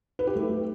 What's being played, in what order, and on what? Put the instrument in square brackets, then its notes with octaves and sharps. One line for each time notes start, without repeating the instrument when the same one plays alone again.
[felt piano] B4
G4
A3